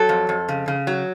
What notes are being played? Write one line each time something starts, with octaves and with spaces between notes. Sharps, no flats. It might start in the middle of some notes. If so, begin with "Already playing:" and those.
Already playing: F#3 A4
F2
F2
C#3
C#3
F#3